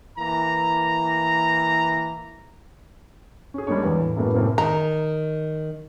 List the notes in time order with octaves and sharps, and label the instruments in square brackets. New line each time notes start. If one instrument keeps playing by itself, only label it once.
[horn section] E3 A#3 A#5
[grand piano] C#4 G#4
G3 G#3 A#3 D4 C#5
E2
A2
F#2 A2 G#3 A#3 B3
F1 A2 A#3 C4
[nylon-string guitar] D#3 [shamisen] A#5